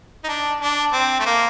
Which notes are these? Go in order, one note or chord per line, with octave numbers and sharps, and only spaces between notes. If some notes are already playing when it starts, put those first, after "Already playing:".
D#4
D4
D4
C4
A3
A#3